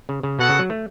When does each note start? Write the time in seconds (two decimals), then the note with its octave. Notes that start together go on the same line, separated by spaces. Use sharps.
0.09 C#3
0.23 C#3
0.39 B2 B3 F#4 A4 F#5
0.49 C#3
0.59 F#3
0.70 A3